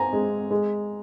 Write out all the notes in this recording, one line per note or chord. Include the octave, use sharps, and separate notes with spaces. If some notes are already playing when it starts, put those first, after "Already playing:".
Already playing: C4 G#5 A#5
G#3
G#3